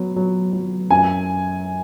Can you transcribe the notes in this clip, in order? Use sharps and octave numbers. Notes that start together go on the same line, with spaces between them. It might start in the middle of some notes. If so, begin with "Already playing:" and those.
Already playing: F#3 B3
F#3
F#3
F#2 G#5